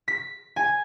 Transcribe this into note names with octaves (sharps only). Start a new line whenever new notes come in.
B6
G#5